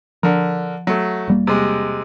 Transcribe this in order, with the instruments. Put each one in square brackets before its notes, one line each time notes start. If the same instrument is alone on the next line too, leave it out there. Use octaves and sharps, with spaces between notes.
[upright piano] D3 A#4 [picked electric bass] F3
[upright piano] F#3 A3
[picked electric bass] E1 G3 A#3
[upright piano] C3 G#3